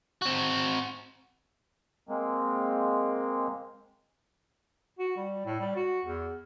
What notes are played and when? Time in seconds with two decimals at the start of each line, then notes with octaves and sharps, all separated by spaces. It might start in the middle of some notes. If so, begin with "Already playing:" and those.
0.22 C4 F#4
2.09 G#3 A#3 C4
4.99 F#4
5.17 G3
5.46 A2
5.60 G3
5.76 F#4
6.05 E2